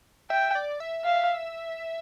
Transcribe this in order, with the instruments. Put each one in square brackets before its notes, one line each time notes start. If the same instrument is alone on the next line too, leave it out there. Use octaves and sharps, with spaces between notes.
[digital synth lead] E5 [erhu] G5
[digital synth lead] D5
E5
[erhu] F5